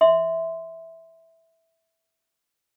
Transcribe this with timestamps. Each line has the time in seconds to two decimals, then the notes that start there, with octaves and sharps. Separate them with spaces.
0.01 E5 C6